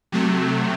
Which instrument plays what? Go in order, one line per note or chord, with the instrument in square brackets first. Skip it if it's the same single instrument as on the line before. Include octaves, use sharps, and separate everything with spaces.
[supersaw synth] C3 F#3 A3